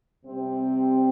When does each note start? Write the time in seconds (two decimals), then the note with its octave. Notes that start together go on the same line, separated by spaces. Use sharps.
0.24 C3 G3 C4